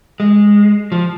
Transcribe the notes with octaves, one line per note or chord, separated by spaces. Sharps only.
G#3
F3